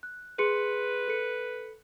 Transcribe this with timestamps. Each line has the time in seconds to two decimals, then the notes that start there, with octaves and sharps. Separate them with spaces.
0.03 F#6
0.39 G#4 B4 C6 C#7
1.08 A4 C#7